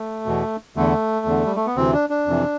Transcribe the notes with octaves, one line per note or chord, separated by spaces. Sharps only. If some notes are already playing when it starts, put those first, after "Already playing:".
Already playing: A3
E2 B2
E2 D3 A3
E2 D3
G3
A3
B3
D2 C3 E3 C4
D4
D4
F2 C3 E3